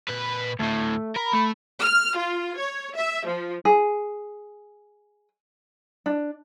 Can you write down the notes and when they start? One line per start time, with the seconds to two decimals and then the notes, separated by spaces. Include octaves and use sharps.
0.08 A#2 B4
0.59 D2 A2 A3
1.16 A#4 B5
1.33 A3
1.81 F6
2.17 F4
2.57 C#5
2.96 E5
3.27 F3
3.65 G#4
6.06 D4